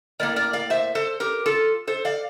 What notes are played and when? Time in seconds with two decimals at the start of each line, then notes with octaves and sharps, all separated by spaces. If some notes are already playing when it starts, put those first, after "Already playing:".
0.20 A2 G3 A#3 A#4 D5
0.36 A#4 D5
0.53 D5 F5
0.70 C5 E5
0.95 A4 C5
1.20 G4 A#4
1.46 F4 A4
1.87 A4 C5
2.05 D5 F5